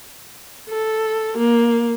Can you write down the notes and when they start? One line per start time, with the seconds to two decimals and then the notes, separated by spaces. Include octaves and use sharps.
0.70 A4
1.38 A#3